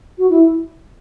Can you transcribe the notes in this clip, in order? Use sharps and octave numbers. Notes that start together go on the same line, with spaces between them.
F#4
E4